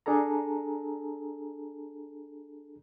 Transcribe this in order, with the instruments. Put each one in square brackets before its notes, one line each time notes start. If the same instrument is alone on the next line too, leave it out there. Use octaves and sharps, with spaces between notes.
[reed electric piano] D4 G#4 A4 A#5